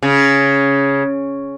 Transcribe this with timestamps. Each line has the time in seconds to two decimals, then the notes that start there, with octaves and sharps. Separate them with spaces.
0.03 C#3